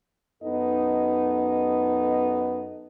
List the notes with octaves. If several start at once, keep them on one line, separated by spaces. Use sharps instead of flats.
F#2 B3 D#4 A4 D#5